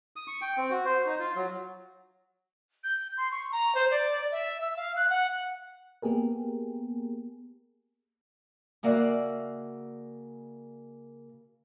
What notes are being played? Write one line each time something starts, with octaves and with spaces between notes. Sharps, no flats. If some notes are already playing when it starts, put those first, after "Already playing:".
D#6
C#6
G5
C4
F#4
C5
D#4
F4
F#3
G6
C6
C#6
A#5
C5
D5
E5
E6
F5
F#6
F#5
A#3 B3 G4 G#4 A#4
C#3 A#3 F#4 D5 E5 F#5